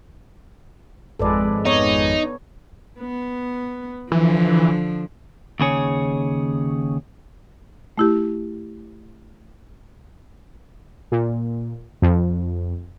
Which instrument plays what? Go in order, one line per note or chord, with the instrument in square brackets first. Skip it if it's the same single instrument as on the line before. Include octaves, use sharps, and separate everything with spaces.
[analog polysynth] G#1 F2 G#3 [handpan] A4 B4 D5
[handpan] B3 C#5 [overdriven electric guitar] D#4
[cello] B3
[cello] D3 F3 [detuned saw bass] E3
[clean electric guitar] D#2 C#3 G#4 C#5
[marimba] A3 E4 G4
[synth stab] A#2
F2